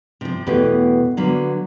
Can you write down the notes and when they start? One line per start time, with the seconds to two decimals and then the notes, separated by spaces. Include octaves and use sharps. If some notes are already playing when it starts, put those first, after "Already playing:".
0.21 C3 F3
0.47 E2 B2 A3 B3 G4
1.17 D3 F#3 A#3 B3